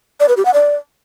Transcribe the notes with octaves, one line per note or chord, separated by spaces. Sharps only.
D5
B4
G4
F#5
D5